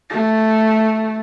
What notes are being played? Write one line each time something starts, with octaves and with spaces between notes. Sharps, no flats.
A3